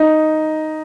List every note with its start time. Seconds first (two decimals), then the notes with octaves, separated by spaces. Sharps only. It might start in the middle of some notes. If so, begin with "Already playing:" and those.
Already playing: D#4